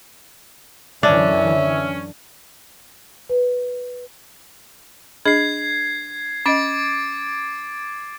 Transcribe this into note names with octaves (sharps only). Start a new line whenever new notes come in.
F#2 D3 E3 C#4 D4 E5
B4
D4 G#4 D#5 G#6 C7
C#4 D#5 D6 A6 D7